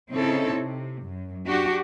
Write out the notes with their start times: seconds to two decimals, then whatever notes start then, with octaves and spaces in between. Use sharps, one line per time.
0.11 C#3 C4 D#4 E4 A4 C#5
0.56 C3
1.04 F#2
1.46 D4 F#4 G4